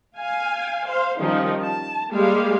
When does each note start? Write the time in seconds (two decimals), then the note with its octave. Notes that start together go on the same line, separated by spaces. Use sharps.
0.18 F5 G#5
0.87 C5 F5
1.18 D#3 F3 G3 C#4 D#4
1.63 A5
2.12 G3 G#3 A#3 G4 G#4 F5